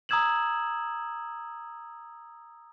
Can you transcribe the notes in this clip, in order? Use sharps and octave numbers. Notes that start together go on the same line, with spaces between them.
A#5 D#6 E6 G#6 E7 F#7